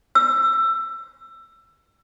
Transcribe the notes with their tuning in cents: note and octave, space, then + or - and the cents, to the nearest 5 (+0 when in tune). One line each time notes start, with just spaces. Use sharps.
E6 +20